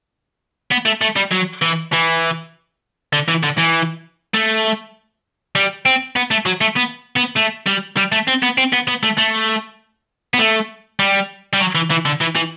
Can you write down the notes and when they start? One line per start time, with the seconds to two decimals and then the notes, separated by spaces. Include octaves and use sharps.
0.72 B3
0.86 A3
1.01 A3
1.16 G3
1.32 F#3
1.62 E3
1.92 E3
3.13 D3
3.28 E3
3.43 D3
3.58 E3
4.34 A3
5.56 G3
5.86 C4
6.16 B3
6.31 A3
6.46 F#3
6.61 A3
6.76 B3
7.17 B3
7.37 A3
7.67 G3
7.97 G3
8.12 A3
8.28 C4
8.42 B3
8.58 C4
8.73 B3
8.88 B3
9.03 A3
9.18 A3
10.34 B3
10.39 A3
10.99 G3
11.53 G3
11.60 F#3
11.75 E3
11.91 E3
12.05 D3
12.21 E3
12.35 E3